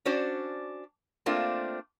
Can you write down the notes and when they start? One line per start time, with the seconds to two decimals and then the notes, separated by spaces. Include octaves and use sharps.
0.05 C#4 D4 F#4 C5 D5
1.26 A3 A#3 C4 D4 F4 A#4